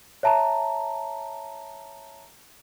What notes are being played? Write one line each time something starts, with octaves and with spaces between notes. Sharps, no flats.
C#5 E5 A5 A#5